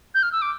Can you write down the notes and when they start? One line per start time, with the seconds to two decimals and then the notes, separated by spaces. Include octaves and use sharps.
0.14 G6
0.23 F6
0.32 E6
0.42 D6